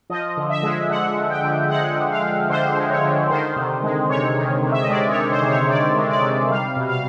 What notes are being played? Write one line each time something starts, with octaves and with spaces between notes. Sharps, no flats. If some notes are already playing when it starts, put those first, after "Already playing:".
F3 D#5
D3
E5
G#3
D3 F#5
F3
G5
D3
G#3 F#5
D3
F5
F3
D3 C5
G#3
C#5
D3
D#3 C5
C3
G#3
C3 C#5
D#3
C3
E5
D#5
G#3 D5
C#5
C3
C5
D#3
C#5
C3 D5
G#3
D5
C3
G3 F5
B2
F5